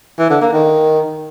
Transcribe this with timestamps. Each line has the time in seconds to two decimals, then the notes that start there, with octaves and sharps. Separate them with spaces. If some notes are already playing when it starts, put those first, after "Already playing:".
0.19 E3
0.30 D3
0.42 A#3
0.53 D#3